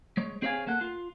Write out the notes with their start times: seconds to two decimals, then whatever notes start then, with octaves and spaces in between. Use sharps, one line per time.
0.17 G#3 C#5
0.42 C4 G#4 C#5 D5 F5 G#5
0.67 A#3 A4 F#5
0.81 F4